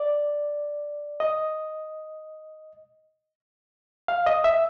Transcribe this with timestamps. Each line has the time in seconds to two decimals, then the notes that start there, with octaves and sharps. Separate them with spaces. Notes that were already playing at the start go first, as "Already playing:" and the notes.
Already playing: D5
1.20 D#5
4.08 F5
4.26 D#5
4.44 E5